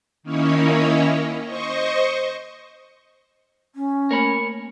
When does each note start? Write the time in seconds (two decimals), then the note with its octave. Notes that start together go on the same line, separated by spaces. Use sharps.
0.23 D#3 A#3 C#4 D#4 E4 C#5
1.44 C5 D#5 C#6
3.75 C#4
4.11 A3 A#3 A#4 C#5 B5